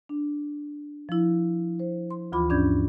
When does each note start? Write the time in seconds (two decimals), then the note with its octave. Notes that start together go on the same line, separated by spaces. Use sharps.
0.09 D4
1.09 F3 E4
1.79 C5
2.11 C6
2.32 D2 E3 F4 B5 D6
2.50 G2 C#4 D4 D5 G6 G#6